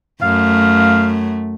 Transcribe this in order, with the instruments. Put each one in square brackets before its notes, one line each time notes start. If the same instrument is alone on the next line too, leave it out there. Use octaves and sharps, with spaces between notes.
[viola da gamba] F#2 A3 [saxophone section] F5